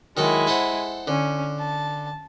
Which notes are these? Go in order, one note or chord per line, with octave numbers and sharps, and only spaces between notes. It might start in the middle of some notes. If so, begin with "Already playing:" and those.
D#3 F#3 G#3 E4 A4
A4 C5 F#5
D3 C#4
A5